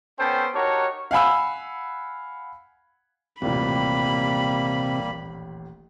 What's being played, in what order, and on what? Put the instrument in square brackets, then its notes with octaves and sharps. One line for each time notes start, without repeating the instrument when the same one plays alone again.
[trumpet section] B3 C#4 A4 C5 G5
D#4 F#4 G4 A#4 C#5 A5
[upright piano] F5 F#5 G#5 B5 E6
[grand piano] D#1 A1 [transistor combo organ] C3 [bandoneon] G3 A#3 [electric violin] B5